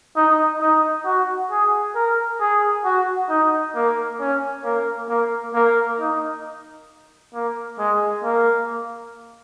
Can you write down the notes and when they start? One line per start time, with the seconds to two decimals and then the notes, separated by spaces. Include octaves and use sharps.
0.16 D#4
0.61 D#4
1.05 F#4
1.51 G#4
1.95 A#4
2.41 G#4
2.85 F#4
3.30 D#4
3.75 A#3
4.20 C#4
4.65 A#3
5.09 A#3
5.54 A#3
6.00 D#4
7.35 A#3
7.79 G#3
8.24 A#3